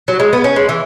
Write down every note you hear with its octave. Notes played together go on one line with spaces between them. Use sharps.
F#3
G#3
B3
C#4
G#3
E3